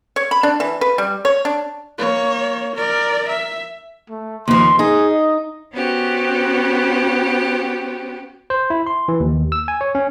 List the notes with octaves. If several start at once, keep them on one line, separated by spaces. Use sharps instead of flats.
C#5
B5
D4
E3
B4
G3
C#5
D4
A#3 C#5
A#4 D5
E5
A3
D#2 F3 C6
D#4 G#4
D#5
B3 C#4 F#4 G4 C5
C5
E4
C6
E3
D#2
E6
G#5
C#5
C#4